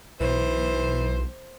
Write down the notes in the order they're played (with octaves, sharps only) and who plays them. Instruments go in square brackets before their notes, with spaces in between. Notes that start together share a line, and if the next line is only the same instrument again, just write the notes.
[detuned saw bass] B1 [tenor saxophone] E3 [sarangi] C5